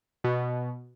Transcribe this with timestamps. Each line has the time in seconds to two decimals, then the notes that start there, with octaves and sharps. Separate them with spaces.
0.24 B2